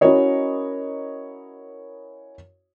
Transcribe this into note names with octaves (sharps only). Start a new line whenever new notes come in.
C#4 E4 F#4 A#4 C#5 D#5